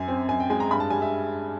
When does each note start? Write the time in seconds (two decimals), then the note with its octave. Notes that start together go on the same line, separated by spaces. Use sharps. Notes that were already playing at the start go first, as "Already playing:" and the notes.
Already playing: F#2 G#5
0.08 C4
0.29 F#2 G#5
0.40 G5
0.50 G#3 G#5
0.60 A#5
0.71 G2 B5
0.80 A5
0.90 G3 G#5
1.02 E5